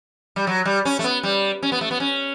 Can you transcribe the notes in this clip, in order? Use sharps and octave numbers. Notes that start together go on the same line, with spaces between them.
G3
F#3
G3
C#4
A3
B3
G3
C#4
B3
A3
B3
C#4